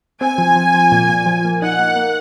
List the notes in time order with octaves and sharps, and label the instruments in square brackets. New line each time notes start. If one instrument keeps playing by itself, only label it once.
[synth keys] C4 [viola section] G#5
[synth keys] F3
F3
F3
A#2
A#2
F3
A#3
[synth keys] D#4 [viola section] F#5
[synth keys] A#3
A#3